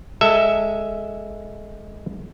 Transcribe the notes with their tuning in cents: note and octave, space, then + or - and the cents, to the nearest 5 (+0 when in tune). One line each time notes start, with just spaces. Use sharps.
G#3 +0 A4 +20 E5 +0